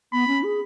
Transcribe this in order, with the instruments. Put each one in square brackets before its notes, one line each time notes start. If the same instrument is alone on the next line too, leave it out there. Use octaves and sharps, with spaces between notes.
[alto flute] B3 [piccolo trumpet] B5
[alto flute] C#4
G#4